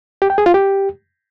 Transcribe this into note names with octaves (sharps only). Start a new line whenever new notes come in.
G4
G5
G#4
F4
G4